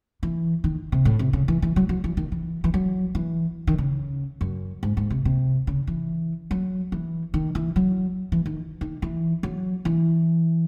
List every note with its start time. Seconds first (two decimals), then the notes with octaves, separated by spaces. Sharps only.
0.23 E3
0.64 D#3
0.92 C3
1.05 A2
1.19 C3
1.33 C#3
1.48 E3
1.62 E3
1.76 F#3
1.89 F#3
2.04 E3
2.17 D#3
2.32 E3
2.64 E3
2.74 F#3
3.15 E3
3.67 D#3
3.78 C#3
4.41 F#2
4.83 G#2
4.97 G#2
5.10 C3
5.25 C3
5.67 C#3
5.87 E3
6.51 F#3
6.92 E3
7.34 D#3
7.55 E3
7.76 F#3
8.32 E3
8.46 D#3
8.81 D#3
9.02 E3
9.43 F#3
9.85 E3